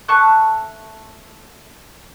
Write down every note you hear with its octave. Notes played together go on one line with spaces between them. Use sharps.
A3 A5 C#6 F#6